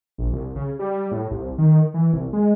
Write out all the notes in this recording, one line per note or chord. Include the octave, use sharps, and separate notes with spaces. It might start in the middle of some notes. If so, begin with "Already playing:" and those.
A#1
C2
C#3
G3
A2
C2
D#3
E3
C2
G#3